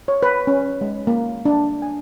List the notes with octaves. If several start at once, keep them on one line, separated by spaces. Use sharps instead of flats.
C#5
B4
C#4
G#3
A#3
D4
G#5